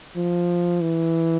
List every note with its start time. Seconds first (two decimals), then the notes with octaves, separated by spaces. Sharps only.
0.16 F3
0.82 E3